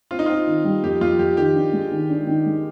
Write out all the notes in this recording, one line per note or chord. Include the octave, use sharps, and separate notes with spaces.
C4 F4
D#4
C4 F4
D#3
G3
F2 G4
F2 F4
F2 G4
D#3 G4
D4
G#3
D#3
D4
D#3
G#3